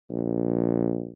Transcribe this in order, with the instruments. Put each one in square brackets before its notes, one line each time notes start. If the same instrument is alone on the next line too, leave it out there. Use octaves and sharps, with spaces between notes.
[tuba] A#1